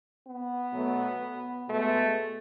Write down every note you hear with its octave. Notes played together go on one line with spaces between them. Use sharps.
B3
B2 F#3 A3
B2 G#3 A3